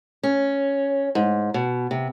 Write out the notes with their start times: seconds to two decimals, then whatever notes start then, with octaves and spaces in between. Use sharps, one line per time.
0.23 C#4
1.15 G#2
1.54 B2
1.91 C3